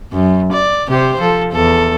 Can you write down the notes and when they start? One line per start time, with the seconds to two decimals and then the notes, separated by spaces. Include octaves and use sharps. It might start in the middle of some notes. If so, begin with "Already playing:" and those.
0.13 F#2
0.52 D5
0.88 C3 G4 C5
1.20 F3 A4
1.52 E2 A4